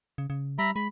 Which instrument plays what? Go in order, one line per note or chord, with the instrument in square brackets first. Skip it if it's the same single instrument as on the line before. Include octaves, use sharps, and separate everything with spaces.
[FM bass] C#3
C#3
[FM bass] G3 [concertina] E5 A#5 B5
[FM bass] G#3 [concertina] B5